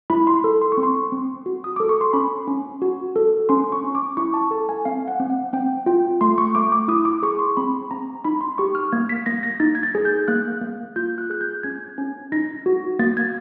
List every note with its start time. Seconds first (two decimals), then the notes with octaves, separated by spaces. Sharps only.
0.10 E4 B5
0.27 C6
0.44 A4
0.62 C6
0.72 C#6
0.77 C4
0.83 C6
1.12 C4
1.46 F#4
1.64 D#6
1.76 A4 D6
1.89 C#6
2.01 C6
2.13 C#4 B5
2.47 C#4
2.82 F#4
3.16 A4
3.49 C#4 C6
3.72 C#6
3.84 C#4
3.95 D6
4.17 E4 C#6
4.34 A5
4.51 A4 A5
4.69 G#5
4.85 C4 F5
5.08 F#5
5.20 C4
5.30 F#5
5.53 C4 G5
5.86 F4 G5
6.21 A3 C6
6.38 C#6
6.55 A3 D6
6.72 D6
6.88 E4 D#6
7.05 D6
7.23 G#4 C#6
7.39 C6
7.57 C4 B5
7.91 C4 A#5
8.24 D#4 B5
8.41 C6
8.58 G4 C#6
8.75 F6
8.92 A#3 G#6
9.09 B6
9.26 A#3 A#6
9.43 A#6
9.60 D#4 A6
9.75 G#6
9.83 A6
9.95 G#4
10.05 G6
10.28 A#3 F#6
10.61 A#3
10.96 F4 G6
11.18 F#6
11.30 G#4 F#6
11.41 G6
11.63 C#4 G#6
11.98 C#4
12.32 D#4 A#6
12.66 F#4
12.99 A#3 A6
13.17 G#6